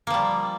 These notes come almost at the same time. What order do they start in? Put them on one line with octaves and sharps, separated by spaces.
A#3 F3 G3